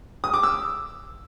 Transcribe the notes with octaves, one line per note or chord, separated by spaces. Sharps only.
D#6
D6
E6